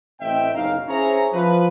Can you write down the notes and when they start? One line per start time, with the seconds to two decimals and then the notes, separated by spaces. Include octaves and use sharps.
0.21 A1 A2 C4 D#5 E5 G5
0.54 F#1 B1 C#3 D#4 A#4 F5
0.88 C#4 E4 G#4 C5 C#5 A#5
1.33 F3 B4